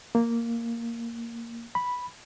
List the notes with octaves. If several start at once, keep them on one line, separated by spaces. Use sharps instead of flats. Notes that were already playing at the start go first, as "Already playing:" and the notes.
A#3
B5